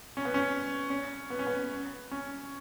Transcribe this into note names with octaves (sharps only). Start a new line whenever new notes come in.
C#4
B3
C#4
C#4
B3
C#4
B3
C#4